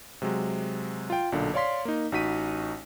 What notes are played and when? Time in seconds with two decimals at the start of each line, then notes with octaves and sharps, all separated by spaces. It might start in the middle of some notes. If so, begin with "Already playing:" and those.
0.22 C3 F#3 G#3
1.10 F4 G5
1.32 B1 A#2 D3
1.54 C#5 D5 F5 C6 B6
1.85 A#3 D#4
2.12 A1 D#4 F#4 B6 D#7